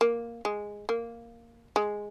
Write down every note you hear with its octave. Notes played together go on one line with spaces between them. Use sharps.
A#3
G#3
A#3
G#3